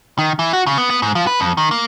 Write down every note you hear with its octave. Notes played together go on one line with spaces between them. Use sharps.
D#3
E3
F#4
C#3
B3
B3
G#2
F3
B4
F2
D#3
A#3